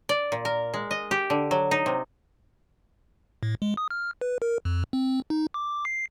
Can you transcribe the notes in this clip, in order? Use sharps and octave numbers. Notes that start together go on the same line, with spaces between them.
D5
A#2
A#4
G#3
D#5
G4
D3
F#3
D#4
C3
A2
G#3
D#6
F6
B4
A#4
F2
C4
D#4
D6
C7